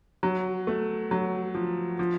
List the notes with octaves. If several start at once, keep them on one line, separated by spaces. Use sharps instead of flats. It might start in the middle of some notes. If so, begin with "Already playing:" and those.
F#3
A3
F#3
F3
F3